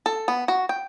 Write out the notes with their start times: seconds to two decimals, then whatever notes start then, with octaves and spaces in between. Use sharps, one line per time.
0.06 A4
0.28 B3
0.48 F#4
0.69 G5